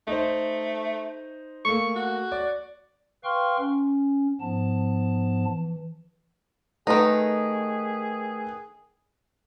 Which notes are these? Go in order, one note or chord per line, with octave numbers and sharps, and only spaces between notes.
A3 D#4 C5
A3 A#3 C#6
F#4
D5
B4 F5 G5 C6 C#6 F6
C#4
G#2 F3 B3 A5
E3
D#3 A3 D#4 G#4 B4